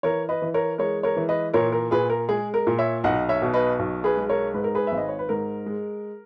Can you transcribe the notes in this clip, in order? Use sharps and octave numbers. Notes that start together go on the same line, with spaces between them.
E3 A#4 C#5
B4 D#5
E3
A#4 C#5
G#3 A#4 C#5
A#4 C#5
E3
B4 D#5
A#2 A#4 C#5
A#4
A#2 G#4 B4
A#4
G#3 G#4
A#4
A#2
C#5 E5
B1 D#5 F#5
C#5 E5
B2
B4 D#5
B1
G#4 B4
G#3
A#4 C#5
G#2 B4
A#4
G#4 B4
G#1 E5
D#5
C#5
B4
G#2 A#4
G#3